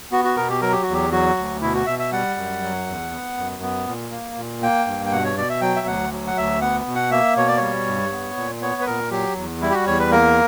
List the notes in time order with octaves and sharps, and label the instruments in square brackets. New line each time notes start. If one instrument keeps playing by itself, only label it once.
[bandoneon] B3 F#4
F#4
B2 A#4
G4
F#3 A#4
G4
E2 F#4
G4
F#3 F#4
D2
B2 E4
F#4
B2 E5
E5
G3 F#5
F#2
F#3
E2
B3
F#2
B3
A#2
A#3
A#2
A#3 G5
G2
G5
B2 F#5
C#5
B2 D5
E5
F#3 G5
E5
D2 F#5
F#3
F#5
D2 E5
B3 F#5
B2
F#5
A#3 E5
B2 C#5
D5
G3 C#5
G2
B3
A#2
B3 C#5
B4
A#2 A#4
F#3 G4
E2
G3 E4
G4
F#4
E2 C#5
B4
A#3 A#4